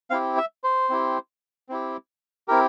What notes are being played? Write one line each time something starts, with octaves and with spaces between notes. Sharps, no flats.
C4 E4 G4 F5
E5
C5
C4 E4 G4
C4 E4 G4
C4 E4 G4 A#4